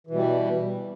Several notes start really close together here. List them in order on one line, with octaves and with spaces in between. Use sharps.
E3 B2 G3